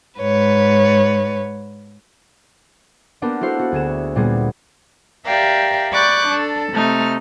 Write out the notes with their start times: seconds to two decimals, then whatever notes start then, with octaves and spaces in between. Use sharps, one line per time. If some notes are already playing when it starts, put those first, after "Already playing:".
0.20 G#2 B4 C#5
3.22 A#3 B3 D4 G4 A#4
3.41 E4 F#4 A4 C5 F5
3.59 F#4
3.72 D2 G#4 E7
4.16 A#2 G3 A#3 B3 G#4
5.25 G4 A#4 D5 E5 F5 G5
5.92 D5 B5 C#6 D6 F#6 G6
6.29 D4 A4
6.73 C3 A3 D#4 F6